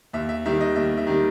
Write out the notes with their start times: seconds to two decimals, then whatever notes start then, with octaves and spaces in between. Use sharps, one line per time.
0.13 D#2 E5
0.29 E5
0.46 D#3 G3 E5
0.61 D#5
0.76 D#2 E5
0.97 E5
1.07 D#3 G3